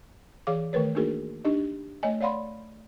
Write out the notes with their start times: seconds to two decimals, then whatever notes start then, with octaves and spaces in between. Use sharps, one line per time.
0.47 E3 G#4 C#5 F5 D6
0.73 D#3 A3 A#4 B4 C#5
0.95 A#3 D4 D#4 F#4 G#4 A#4
1.45 D4 D#4 G4 D#5
2.03 A3 C#5 D#5 G#5
2.21 C#5 D5 F5 F#5 B5 C6